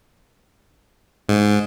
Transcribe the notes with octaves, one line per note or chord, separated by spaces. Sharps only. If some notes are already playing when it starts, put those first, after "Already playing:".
G#2